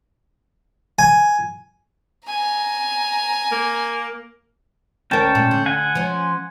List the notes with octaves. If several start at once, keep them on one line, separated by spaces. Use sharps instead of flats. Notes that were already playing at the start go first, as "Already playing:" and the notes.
G#5
G#5 A#5
A#3
D2 C#4 A#4 G5 A5
A#2
D3
F#5 G#5
F3 C#4